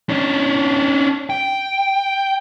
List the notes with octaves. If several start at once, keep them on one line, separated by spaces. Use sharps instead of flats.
C#4 D4
G5